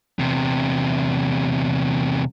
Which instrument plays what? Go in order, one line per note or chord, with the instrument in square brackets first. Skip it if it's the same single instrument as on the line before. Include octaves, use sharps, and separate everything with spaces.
[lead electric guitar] E2 C3